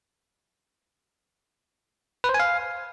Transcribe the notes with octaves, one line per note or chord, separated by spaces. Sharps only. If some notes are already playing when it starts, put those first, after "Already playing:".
B4
C5
G#5
F5